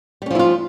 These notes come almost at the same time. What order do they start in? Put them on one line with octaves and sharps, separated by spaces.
G3 C#4 F3 E4 F4